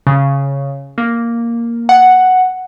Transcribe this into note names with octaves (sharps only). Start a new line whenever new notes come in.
C#3
A#3
F#5